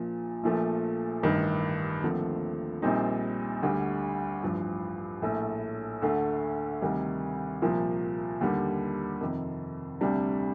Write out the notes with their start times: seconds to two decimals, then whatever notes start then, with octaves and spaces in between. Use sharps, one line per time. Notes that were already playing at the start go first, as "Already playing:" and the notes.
Already playing: A#1 A#2 F3
0.43 A#1 A#2 F3 A3
1.23 A1 G2 D#3
2.03 D#2 D3 F3 A3 C4
2.82 A#1 A#2 G3 C4 D#4
3.62 D2 D3 G3
4.42 A1 G2 F3
5.22 A#1 A2 A3
6.02 D2 D3 A3
6.82 D2 C3 D#3 G3
7.62 C2 A#2 F3 A#3
8.41 D#2 D3 G3
9.21 F2 C3 D#3
10.01 D2 C3 G3 D4